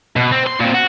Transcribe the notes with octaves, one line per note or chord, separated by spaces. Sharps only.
B2
C4
C6
A#2 C4
F#4